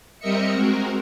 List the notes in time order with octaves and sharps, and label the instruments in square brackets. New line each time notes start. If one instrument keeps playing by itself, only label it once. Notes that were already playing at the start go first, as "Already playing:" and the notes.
[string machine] G3 C4 A#4 D#5 E5 C#7
G#3 C4 F#4 A#4